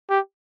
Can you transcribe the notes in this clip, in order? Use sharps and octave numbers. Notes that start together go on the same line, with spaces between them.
G4